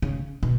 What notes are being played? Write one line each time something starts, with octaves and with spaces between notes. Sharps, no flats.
C#3
B2